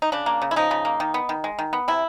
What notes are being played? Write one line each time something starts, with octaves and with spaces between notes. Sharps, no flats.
D#4
C#3 D4
A#3
C#3
E4
F3 D#4
C#3
A#3
D#3
B3
D#3
G#3
D#3
B3
C3 E4